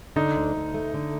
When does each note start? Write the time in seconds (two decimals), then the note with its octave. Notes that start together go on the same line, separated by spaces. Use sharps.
0.16 D3 D#4
0.35 D2
0.55 D2
0.74 A3
0.94 D3